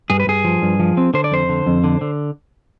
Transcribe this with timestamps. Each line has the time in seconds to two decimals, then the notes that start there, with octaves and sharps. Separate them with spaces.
0.10 G2 G#4
0.20 B4
0.27 G2 G#4
0.45 F3
0.62 G2
0.80 F3
0.97 C4
1.14 D3 C5
1.24 D5
1.31 F2 C5
1.49 D3
1.67 F2
1.84 D3
2.01 D3